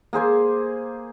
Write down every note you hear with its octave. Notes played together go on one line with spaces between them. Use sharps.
A#3 G#4 C5 G#5